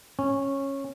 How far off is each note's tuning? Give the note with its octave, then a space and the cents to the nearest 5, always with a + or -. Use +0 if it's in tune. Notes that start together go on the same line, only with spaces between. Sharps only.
C#4 -15